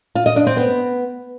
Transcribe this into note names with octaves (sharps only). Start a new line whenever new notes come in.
F4
D#5
D4
C4
B3